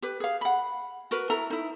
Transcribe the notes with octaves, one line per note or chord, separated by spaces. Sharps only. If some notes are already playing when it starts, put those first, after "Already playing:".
G4 B4
G#4 F5
F#5 B5
F#4 A#4 B4
E4 A4 A#5
D#4 E4